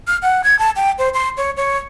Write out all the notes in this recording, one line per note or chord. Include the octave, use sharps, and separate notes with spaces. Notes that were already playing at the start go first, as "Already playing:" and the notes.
F6
F#5
G#6
A5
G5
C5
C6
C#5
C#5